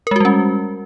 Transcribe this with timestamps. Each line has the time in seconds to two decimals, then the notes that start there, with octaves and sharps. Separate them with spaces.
0.07 A#4
0.11 G#3
0.16 F#4
0.20 G3
0.25 C#4